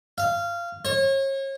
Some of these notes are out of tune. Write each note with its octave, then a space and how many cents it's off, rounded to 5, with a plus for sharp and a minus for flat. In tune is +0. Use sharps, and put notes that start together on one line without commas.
F5 -20
C#5 -35